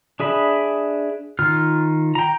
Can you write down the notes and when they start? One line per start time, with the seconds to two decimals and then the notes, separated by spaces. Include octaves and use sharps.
0.20 D4 G#4 E5 B5
1.39 D#3 F4 F6
2.15 G5 A#5